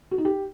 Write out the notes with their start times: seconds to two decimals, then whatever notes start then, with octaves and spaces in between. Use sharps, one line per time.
0.11 F#4
0.18 D#4
0.25 G4